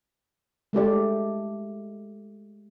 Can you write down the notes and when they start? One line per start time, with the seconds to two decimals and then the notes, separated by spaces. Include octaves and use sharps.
0.73 G#3 A3 G4 D5